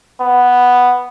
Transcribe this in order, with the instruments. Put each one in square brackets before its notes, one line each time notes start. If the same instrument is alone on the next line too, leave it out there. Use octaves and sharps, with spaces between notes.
[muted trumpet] B3